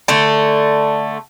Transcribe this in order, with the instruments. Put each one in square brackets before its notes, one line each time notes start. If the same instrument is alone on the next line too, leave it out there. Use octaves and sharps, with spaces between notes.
[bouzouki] D3 A3